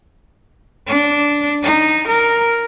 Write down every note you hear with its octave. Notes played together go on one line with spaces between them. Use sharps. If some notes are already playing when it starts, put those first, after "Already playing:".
D4
D#4
A#4